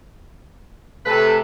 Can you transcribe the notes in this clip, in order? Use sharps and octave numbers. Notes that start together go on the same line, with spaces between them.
C3 A3 A4 B4